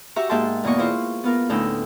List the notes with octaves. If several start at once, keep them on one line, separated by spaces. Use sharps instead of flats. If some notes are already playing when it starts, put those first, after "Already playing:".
F#4 G4 E5 A#5 C#6
G#2 A#3 E5 G5 A5 C6
E2 B2 A#3 D#5 C#6
E4 F4 C5 C#6
B3 F4 A#4
D2 A2 C#4 D#4 G5 E6